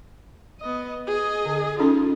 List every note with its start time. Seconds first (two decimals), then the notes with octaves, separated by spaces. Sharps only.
0.61 B3 D#5
1.07 G#4 D#5
1.46 D3
1.80 C#4 D#4 F4 A4